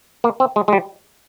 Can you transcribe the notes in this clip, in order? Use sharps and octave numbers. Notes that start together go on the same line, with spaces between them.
A#3
C4
G#3
G#3
G3